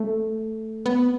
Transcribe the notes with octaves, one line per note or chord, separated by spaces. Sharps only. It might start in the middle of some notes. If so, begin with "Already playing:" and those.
Already playing: A3
B3